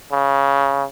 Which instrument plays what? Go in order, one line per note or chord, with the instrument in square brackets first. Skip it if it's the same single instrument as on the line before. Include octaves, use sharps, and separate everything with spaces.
[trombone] C#3